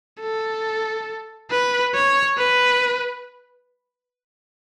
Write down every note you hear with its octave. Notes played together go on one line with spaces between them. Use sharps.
A4
B4
C#5
B4